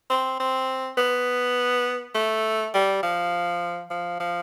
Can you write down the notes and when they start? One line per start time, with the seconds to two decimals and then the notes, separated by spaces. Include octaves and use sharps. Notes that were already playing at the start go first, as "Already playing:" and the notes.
0.10 C4
0.40 C4
0.98 B3
2.15 A3
2.74 G3
3.03 F3
3.91 F3
4.20 F3